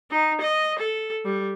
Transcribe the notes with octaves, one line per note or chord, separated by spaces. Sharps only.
D#4
D#5
A4
G3